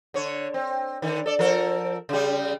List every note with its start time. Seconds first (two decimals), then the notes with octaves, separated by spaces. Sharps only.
0.14 D3 C#5
0.54 C4
1.02 D3 D#3
1.26 A4 D5
1.39 F3 A4 A#4
2.09 C#3 G3